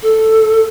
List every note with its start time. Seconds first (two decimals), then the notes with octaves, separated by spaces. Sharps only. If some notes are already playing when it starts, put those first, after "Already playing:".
0.01 A4